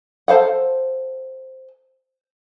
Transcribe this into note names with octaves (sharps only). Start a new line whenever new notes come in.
A4 C5 F5 F#5